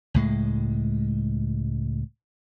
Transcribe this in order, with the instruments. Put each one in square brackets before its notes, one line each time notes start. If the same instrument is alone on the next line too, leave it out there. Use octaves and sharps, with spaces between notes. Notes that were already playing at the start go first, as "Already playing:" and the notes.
[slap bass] C#2 A2 G#3